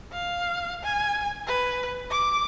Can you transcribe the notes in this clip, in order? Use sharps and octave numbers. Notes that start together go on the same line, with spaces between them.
F5
G#5
B4
D6